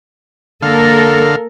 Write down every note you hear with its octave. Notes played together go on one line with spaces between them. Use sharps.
D3 A#3 A4 A#4 F5